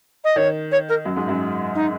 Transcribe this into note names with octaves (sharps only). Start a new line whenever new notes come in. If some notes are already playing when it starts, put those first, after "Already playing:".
D#5
D#3 C#5
C#5
A#4
F#2 F#3
G#2 G#3
F#2 F#3
D#4